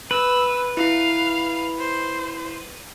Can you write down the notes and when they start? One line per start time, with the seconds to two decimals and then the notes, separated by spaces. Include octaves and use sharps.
0.11 B4 E6
0.77 E4 F5
1.79 C5